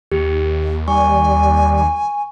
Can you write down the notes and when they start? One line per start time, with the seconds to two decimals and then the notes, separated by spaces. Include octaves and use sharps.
0.12 D#2 G4
0.88 G3 G#5 C#6